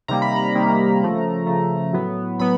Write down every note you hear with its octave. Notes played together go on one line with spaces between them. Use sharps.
C3 D#3 G3 A#3 A#5
B5
A#5
C3 D#3 G3 A#3
C#3 F3 A3
C#3 F3 A3
A2 F#3 B3
A2 F#3 B3 B5